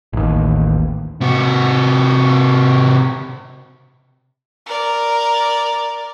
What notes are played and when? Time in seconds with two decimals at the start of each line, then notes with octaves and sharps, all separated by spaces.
0.13 A1 D#2
1.21 C3 F#4
4.66 A#4 D5